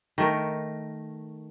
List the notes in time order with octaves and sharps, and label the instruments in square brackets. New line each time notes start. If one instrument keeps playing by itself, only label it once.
[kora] D#3 A3 A#4